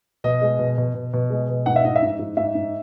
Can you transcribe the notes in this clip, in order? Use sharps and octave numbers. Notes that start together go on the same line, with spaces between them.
B2 D#5
G#3
B2
B2
B2
B2
G#3
B2
G#2 F#5
E5
G#2 D#5
E5
G#2
G#2
G#2 E5
G#2